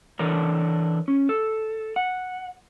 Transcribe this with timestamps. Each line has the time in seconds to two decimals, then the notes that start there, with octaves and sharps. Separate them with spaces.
0.19 E3 D4 A4 A#4 C#5
1.08 C#4
1.29 A4
1.96 F#5